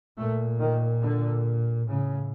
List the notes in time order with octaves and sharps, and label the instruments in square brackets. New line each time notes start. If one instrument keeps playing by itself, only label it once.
[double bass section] A#2 A3
D#3
D3
A2 C#3